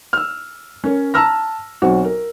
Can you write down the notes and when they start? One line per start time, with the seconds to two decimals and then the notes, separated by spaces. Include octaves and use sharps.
0.13 E6 F6
0.84 C#4 A#4 C#5
1.14 A5 A#5 E6 F6 A#6
1.82 B1 C4 F#4
2.04 A#4